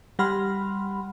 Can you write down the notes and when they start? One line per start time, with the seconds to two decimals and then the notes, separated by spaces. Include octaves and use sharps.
0.19 G3 G4 F#5 B5 C6 F6